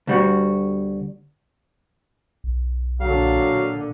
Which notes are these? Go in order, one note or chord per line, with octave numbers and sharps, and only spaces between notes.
D2 G3 F#4
B1
A#2 D3 F#3 F5